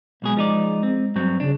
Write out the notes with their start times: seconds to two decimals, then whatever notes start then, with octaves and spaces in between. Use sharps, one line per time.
0.22 B1 B2 G#3 G#4
0.37 F3 D#4 D5
0.83 C4
1.15 G2 F#3 C4
1.40 C#3 D4